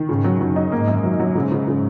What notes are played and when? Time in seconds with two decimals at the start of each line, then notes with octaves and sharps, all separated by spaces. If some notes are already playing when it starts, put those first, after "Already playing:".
Already playing: D#3
0.08 G#2 C#3
0.24 F#3
0.40 F#2 F#3
0.56 D#4
0.72 G#2 A#3
0.87 F#2
1.03 F#3
1.20 F#3
1.35 G#2 C#3
1.52 C#3
1.68 C#3